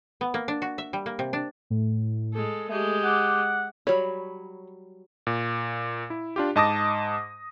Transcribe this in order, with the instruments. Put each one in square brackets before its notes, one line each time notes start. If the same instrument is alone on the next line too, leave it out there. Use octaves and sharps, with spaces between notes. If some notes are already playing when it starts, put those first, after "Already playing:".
[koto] B3
A#3
D4
F#4
E5
G3
A#3
C3
D4
[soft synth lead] A2
[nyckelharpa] G#3 A4
[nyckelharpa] G#3 G4 [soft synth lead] A3
[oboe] F#5 [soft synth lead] D6
[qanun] F#3 G3 B5 [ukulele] C#5
[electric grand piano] A#2
E4
D4 F4 G4
G#2 D#5 A5 D6 D#6 A#6